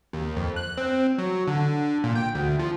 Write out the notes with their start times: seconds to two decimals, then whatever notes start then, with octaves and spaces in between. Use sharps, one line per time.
0.13 D#2
0.37 F2
0.56 F#6
0.78 C4
1.18 F#3
1.48 D3
2.04 A#2
2.15 G5
2.35 D2
2.59 F3